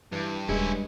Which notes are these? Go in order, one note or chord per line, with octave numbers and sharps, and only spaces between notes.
G2 E3
D#1 G2 G#3 C#4 E4